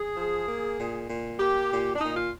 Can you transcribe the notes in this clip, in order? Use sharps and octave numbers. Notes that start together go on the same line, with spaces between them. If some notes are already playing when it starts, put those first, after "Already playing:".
Already playing: G#4
F3
A#3
A#2
A#2
A#3 G4
A#2
D4
A#2 D#4
F4